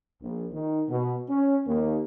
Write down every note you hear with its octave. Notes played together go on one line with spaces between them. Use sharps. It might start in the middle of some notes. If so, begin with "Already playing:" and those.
A#1
D#3
B2
C#4
D#2